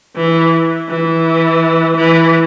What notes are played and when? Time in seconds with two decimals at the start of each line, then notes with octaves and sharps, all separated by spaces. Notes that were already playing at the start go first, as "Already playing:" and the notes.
0.16 E3
0.89 E3
1.96 E3